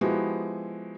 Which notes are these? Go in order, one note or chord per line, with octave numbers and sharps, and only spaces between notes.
F3 G#3 B3 E4 F#4 G4